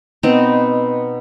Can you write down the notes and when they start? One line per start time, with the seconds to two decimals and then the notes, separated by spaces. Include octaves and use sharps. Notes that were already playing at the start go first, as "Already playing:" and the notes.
0.23 B2 B3 C4 D#4